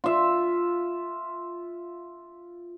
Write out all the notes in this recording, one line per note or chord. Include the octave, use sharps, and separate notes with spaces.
F4 E5